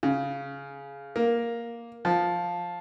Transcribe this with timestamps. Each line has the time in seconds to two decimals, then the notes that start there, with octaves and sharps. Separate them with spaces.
0.03 C#3
1.16 A#3
2.05 F3